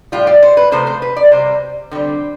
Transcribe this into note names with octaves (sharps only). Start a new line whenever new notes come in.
A2 G3 F4
D5
C5
B4
C3 F3 A3 C5
C5
B4
D5
C3 G3 C5
D3 G3 C4